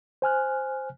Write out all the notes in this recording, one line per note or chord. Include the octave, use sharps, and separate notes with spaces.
C5 G#5 F6 F#6